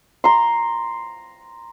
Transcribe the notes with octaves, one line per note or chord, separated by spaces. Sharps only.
A#5 C6